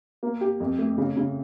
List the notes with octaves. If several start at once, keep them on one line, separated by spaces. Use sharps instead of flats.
A#3
G4
F2
A3
C#3
C#3